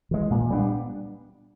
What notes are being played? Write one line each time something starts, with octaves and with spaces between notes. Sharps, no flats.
E3 G#3
A#2
G3 B3 D4